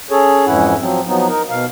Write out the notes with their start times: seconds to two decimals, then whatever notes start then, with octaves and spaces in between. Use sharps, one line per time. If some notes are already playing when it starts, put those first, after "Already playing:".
0.10 C#4 G#4 A4 C#5
0.46 F2 G#2 E3 C#4 E4 F#5
0.80 F3 F#3 C4
1.07 F3 F#3 B3 D#4
1.29 D#4 A#4
1.50 B2 F5